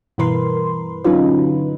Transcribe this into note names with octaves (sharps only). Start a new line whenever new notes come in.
G2 B2 E3 A#4 B4 C6
D3 F#3 C#4 D#4 F4 B4